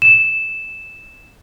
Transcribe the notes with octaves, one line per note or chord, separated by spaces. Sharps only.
E7